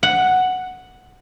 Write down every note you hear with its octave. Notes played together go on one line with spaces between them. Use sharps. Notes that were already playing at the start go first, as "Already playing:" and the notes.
F#5